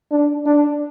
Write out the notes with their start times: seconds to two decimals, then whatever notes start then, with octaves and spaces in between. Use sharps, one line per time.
0.11 D4
0.46 D4